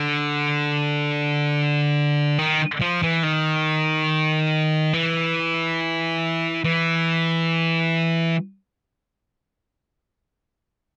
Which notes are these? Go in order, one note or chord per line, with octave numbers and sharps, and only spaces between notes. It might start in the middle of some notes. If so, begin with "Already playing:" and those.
Already playing: D3
D#3
F3
E3
D#3
E3
E3